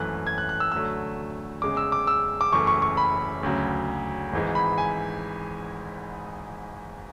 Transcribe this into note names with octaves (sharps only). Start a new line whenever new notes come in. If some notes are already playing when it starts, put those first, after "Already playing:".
Already playing: G#1 F#2 E3 A3 F#6
G#6
F#6
F#6
E6
D2 D3 F#3 A3 E6
E2 C#3 G#3 D6
E6
D6
E6
D6
F#1 F#2 E3 A3 C#6
C#6
C#6
B5
D2 C#3 F#3
G#1 G#2 E3 G#3
B5
G#5